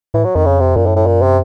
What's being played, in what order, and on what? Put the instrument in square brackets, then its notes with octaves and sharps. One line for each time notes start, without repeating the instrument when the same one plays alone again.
[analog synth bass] A2 [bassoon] E3
[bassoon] F#3
[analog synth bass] F2 [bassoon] D#3
[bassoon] C#3
C3
[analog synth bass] F#2 [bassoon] A#2
[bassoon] A2
A2
A#2
C3